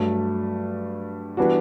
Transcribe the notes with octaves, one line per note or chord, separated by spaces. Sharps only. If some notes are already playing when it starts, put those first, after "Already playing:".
Already playing: G2 F#3 A3
E3 G3 B3 D4 F#4